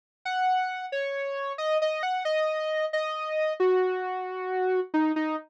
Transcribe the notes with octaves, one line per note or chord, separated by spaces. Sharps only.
F#5
C#5
D#5
D#5
F#5
D#5
D#5
F#4
D#4
D#4